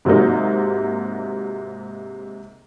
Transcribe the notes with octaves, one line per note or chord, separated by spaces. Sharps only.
G#2 C3 F#3 G#3 A#3 D#4